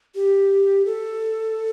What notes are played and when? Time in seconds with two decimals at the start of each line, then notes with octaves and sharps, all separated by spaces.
0.15 G4
0.85 A4